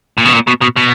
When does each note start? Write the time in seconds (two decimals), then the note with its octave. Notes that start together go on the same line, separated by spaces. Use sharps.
0.18 A#2
0.25 B2
0.33 A#2
0.48 B2
0.62 B2
0.77 B2